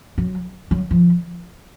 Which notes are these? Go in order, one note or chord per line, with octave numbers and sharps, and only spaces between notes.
F#3
F#3
F3